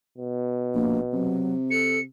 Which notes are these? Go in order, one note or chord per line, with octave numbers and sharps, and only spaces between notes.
B2
A#1 A#3
C3 F#3
A4 C#7